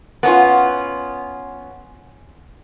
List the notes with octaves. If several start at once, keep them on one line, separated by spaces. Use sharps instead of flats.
B3 C#4 F4